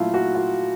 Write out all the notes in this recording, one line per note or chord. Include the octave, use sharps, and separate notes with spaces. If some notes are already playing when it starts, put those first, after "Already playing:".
Already playing: A#2 F#3 A3 E4 F4
F#4
F4